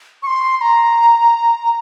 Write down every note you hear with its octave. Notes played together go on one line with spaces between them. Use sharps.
C#6
C6
C6
A#5
A#5